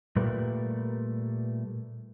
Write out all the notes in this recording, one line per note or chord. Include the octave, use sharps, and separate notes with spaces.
A#2 G3 A3 A#4 B4